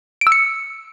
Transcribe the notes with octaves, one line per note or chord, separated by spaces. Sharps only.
D7
E6
C#7